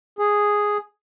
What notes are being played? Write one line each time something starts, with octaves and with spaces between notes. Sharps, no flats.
G#4